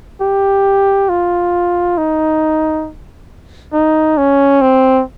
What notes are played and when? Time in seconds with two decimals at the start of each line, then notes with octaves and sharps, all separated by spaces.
0.21 G4
1.09 F4
1.98 D#4
3.73 D#4
4.17 C#4
4.62 C4